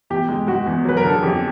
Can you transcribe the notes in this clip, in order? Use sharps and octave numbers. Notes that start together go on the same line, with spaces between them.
E2 G4
G#3
G#3 F#4
E2
F#3 B4
A#4
D3 A4
G#4
F2 G4